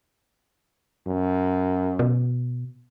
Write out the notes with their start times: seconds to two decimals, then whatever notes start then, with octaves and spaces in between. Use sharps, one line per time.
1.06 F#2
1.99 B2